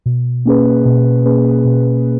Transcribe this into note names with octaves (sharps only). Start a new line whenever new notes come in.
B2
A#3 C#4 G#4 B4
B2
A#3 C#4 G#4 B4
B2